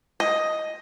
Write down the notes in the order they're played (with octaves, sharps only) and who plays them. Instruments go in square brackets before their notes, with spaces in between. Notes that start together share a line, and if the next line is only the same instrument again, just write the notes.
[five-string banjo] D#5